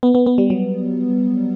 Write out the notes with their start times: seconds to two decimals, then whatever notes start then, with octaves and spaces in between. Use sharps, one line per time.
0.03 B3
0.15 B3
0.26 B3
0.38 G3
0.50 F#3